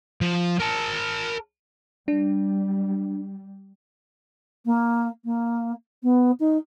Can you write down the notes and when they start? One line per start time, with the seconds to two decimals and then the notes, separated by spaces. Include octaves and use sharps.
0.21 F3
0.60 A#4 A5
2.08 G3 D4
4.66 A#3
5.25 A#3
6.03 B3
6.40 D#4